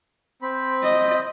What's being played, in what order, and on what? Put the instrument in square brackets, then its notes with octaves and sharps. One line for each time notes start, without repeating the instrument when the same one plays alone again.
[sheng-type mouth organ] C4 B5
[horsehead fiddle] D#5